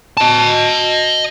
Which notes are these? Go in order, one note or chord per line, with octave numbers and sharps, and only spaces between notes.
D#5 A5